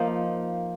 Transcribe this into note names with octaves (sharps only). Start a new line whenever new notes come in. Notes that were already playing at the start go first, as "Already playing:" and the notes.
Already playing: F3 A#3 D#4